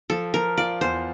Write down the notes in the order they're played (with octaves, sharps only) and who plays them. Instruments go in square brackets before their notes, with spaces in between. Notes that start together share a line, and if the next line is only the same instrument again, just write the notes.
[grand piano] F3 [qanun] A4
[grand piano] F3 [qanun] A#4
[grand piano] F4 [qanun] D5
[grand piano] E2 [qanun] C5